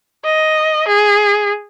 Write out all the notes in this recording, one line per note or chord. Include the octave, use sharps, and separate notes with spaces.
D#5
G#4